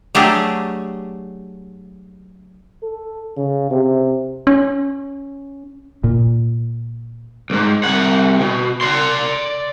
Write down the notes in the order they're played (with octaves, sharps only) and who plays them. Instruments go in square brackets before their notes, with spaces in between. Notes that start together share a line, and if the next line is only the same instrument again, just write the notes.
[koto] F#3 A3 D4 G4 G#4
[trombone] A4
C#3
C3
[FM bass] C#4
[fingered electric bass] A#2
[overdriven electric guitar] C2 G#2
C2 F#5
B2
D5 C6